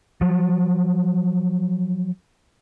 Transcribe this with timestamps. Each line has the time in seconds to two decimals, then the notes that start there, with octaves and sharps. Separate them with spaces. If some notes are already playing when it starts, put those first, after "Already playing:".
0.21 F3 F#3